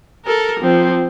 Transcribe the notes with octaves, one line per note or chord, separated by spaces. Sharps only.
A4 A#4
F3 C4